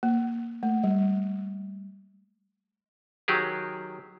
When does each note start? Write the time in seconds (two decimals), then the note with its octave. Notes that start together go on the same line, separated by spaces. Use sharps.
0.03 A#3
0.63 A3
0.84 G3
3.28 D#3 F#3 G4 G#4